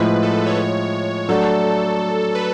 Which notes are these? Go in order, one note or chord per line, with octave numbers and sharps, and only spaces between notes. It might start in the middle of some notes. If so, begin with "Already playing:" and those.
Already playing: A2 F3 G#3 B4
A4
B4
C#5
F#3 A3 D4 F#4 A4
B4